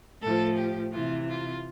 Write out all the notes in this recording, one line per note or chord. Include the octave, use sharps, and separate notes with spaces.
A2 F3 A4
G4
C3 E3 F4
F4